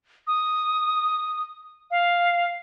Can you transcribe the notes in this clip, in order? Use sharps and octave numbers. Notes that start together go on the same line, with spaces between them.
D#6
F5